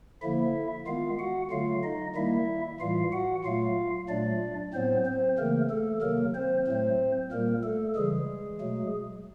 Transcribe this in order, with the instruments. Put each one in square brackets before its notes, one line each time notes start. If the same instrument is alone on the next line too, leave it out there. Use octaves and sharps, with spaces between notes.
[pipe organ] D3 F3 A#3 E4 E5
D#3 G#3 B3 F4 F5
F#4 F#5
D3 F#3 A3 F4 F5
D#4 D#5
D#3 G3 A#3 E4 E5
A2 E3 G3 F4 F5
F#4 F#5
A#2 F#3 A3 F4 F5
A#2 F#3 A3 D4 D5
A2 F#3 B3 C4 C5
C4 C5
C#3 E3 A3 A#3 A#4
A3 A4
C3 D#3 F#3 A#3 A#4
C4 C5
A2 F#3 A3 C4 C5
A#2 G3 A#3 A#4
A3 A4
C#3 E3 G3 G#3 G#4
B2 F#3 A3